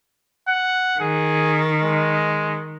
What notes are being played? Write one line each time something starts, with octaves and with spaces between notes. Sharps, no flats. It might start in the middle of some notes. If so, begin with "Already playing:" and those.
F#5
D#3 G#4
G#3